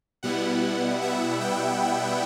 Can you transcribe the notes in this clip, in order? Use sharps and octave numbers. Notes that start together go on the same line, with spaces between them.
B2 G3 B3 E4 F#5
E5
G5